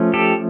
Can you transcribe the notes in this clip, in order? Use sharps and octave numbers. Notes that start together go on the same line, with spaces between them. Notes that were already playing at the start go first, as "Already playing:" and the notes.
Already playing: F3 A3 C#4
G4 A4